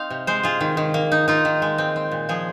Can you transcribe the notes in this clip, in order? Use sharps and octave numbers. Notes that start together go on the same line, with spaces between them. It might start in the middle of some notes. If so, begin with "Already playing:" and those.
Already playing: C4 D#4 F5
C3
G#3 C5
F4 G#4
D#3
D#3
A#3
D#4
D#4 F4
D#3
G#3
C4
C4
A#2
F3 G#4